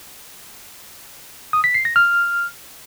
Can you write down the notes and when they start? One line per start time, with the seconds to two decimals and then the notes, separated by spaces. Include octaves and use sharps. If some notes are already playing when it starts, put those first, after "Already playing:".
1.53 D#6
1.64 B6
1.75 C7
1.85 A#6
1.96 F6